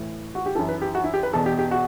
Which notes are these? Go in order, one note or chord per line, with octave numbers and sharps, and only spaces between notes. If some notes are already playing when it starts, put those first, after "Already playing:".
Already playing: A2 E3
F#4
G4
F#2 E3 A4
B4
G4
F#4
E4
G4
B4
E2 B2 A4
G4
G4
F#4